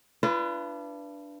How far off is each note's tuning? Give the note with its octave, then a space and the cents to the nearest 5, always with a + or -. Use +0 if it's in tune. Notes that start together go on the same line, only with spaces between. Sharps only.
D4 +0 F4 -45 B4 +0